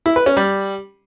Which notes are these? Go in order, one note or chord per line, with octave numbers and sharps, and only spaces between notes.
E4
B4
C#4
G3